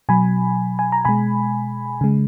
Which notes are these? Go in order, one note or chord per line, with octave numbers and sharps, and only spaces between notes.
B2 F#3 G#5 B5
G#5
A#5
B2 G#3 G#5 B5
C#3 G#3